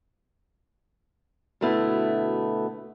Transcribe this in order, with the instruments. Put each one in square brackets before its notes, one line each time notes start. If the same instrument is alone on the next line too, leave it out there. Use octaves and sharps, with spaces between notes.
[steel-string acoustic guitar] D2 B2 A3 B3 E4